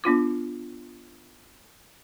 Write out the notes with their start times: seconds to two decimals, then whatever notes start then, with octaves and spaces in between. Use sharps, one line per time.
0.04 B3 D4 F4 D6